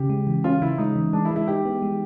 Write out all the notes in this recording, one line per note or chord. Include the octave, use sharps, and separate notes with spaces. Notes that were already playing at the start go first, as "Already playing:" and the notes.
Already playing: C#3 C#4 G4
G#3
E3
C#4 F4
C#3 E4
G#3 D#4
E3
G#3 D4
E4
G#3
E4
D#4 G4
B3
G#3